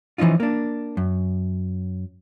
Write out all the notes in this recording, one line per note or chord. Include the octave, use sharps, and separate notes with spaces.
E3 F3 C#4 D#4 F4
A#3 D4
F#2